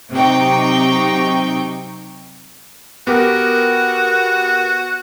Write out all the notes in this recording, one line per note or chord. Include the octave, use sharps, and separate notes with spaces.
C3 F#3 D#4 G5 C#6
B3 F#4 G4 A#4